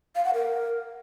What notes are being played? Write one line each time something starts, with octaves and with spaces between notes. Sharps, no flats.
F5
F#5
A#4